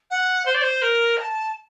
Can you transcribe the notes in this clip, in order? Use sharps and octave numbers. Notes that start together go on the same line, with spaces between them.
F#5
C5
D5
C5
A#4
A#5
A5